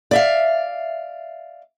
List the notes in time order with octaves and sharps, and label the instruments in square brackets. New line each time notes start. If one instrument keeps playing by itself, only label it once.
[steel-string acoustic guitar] D5 E5 F5